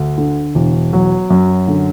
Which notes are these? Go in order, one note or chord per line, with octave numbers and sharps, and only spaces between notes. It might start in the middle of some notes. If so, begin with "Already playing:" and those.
Already playing: D2
D3
E1
F#3
F#2
D3